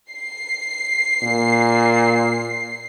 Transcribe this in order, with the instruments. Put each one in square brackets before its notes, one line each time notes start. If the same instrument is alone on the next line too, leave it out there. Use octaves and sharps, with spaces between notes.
[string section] C7
[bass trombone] A#2